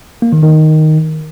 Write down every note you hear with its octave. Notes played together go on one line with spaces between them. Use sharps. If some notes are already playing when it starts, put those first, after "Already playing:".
A#3
D#3
D#3